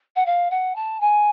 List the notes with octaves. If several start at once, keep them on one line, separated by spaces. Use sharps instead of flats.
F#5
F5
F#5
A5
G#5